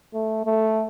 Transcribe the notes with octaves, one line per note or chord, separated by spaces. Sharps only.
A3
A3